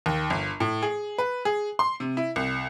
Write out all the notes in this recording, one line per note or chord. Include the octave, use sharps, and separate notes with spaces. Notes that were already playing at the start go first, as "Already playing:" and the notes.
D#2
G1
A2
G#4
B4
G#4
C6
C3
E4
C2